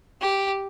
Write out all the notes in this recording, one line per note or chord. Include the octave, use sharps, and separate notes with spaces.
G4